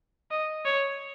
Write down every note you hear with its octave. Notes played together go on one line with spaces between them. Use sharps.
D#5
C#5